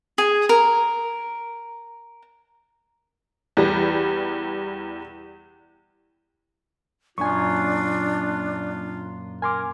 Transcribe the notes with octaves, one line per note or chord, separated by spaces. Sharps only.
G#4
A#4
E2 G3
F#2 A#2 D4 F4 G#5 C#6
A#4 G#5 C6 D6